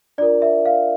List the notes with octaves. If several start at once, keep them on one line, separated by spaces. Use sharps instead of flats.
D4 F4 A#4 D5
E5
F5